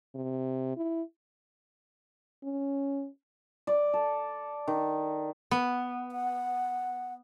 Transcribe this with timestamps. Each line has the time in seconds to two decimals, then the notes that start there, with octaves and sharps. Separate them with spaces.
0.15 C3
0.77 E4
2.44 C#4
3.67 D5
3.94 A4
4.68 D#3
5.51 B3
6.12 F#5